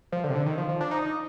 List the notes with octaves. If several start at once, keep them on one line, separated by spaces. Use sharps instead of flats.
F3
D3
C3
D3
D#3
F3
F3
D4
D#4
D#4